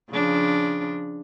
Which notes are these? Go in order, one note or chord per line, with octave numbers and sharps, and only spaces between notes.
C#3 F3 D4